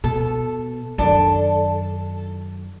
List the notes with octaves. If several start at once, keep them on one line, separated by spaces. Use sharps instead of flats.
B2 A4
F#2 D#3 D4 A4